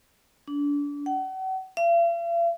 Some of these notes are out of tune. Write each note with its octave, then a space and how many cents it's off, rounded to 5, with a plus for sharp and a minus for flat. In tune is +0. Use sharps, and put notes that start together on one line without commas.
D4 -30
F#5 +40
F5 -45